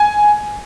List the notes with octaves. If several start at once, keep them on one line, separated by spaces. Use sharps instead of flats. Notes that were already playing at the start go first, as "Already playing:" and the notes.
Already playing: G#5